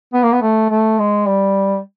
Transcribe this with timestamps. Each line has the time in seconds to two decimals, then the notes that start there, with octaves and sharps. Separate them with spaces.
0.14 B3
0.23 A#3
0.32 B3
0.42 A3
0.70 A3
0.99 G#3
1.28 G3